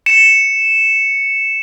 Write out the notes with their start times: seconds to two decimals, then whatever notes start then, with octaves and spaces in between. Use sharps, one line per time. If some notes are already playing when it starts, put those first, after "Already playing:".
0.06 C#7 E7